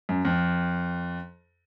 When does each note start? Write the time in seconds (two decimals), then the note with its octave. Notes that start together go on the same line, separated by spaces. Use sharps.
0.09 F#2
0.25 F2